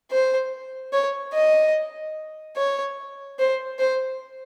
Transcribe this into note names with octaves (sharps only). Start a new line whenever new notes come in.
C5
C#5
D#5
C#5
C5
C5